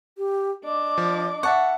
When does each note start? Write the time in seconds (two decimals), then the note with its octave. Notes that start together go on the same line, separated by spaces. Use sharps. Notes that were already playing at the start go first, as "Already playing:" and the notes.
0.18 G4
0.64 D4 D#5 D6
0.98 F3
1.43 E5 F#5 A5 C#6